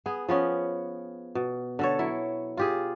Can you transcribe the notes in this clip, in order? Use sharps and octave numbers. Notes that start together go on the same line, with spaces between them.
B3 G#4
F3 B3 C#4
B2
D3 A4 C#5
F#3 E4
F4 G4 G#4